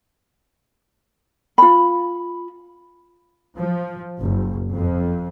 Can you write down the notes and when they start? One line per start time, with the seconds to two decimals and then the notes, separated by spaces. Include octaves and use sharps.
1.58 F4 B5
3.58 F3
4.19 F#1
4.77 F2